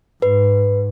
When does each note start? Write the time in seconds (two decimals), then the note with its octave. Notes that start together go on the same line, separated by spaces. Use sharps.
0.22 G#2 B4